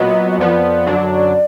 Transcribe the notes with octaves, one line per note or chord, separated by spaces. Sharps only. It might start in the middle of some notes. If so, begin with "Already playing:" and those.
Already playing: A#2 F#3 B3 D#5
D#5
F2 F3 B3 D5
F#2 D3 F#3 D4